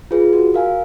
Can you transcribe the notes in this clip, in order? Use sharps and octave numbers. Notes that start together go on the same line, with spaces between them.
F4 G#4 B4
F#4
A#4 F5 G#5